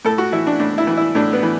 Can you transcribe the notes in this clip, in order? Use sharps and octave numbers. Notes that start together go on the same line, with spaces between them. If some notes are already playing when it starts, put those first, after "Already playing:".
A2 A4
F#4
E3 E4
D4
A2 D4
E4
E3
E4
A2 D4
B3
E3